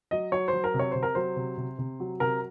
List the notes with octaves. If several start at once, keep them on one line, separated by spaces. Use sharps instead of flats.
F#3 D#5
F#3 C#5
C5
F#3
A#4
C3
C#5
C3 C5
A#4
F#3 C5
C3
C3
C3
F#3
C3 A#4